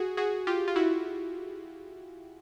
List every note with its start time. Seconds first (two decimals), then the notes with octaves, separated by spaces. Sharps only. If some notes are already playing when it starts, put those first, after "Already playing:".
Already playing: F#4 G#4
0.17 F#4 G#4
0.47 F4 G4
0.68 F4
0.76 E4 F#4